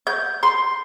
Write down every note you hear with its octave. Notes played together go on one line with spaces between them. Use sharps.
G6
C6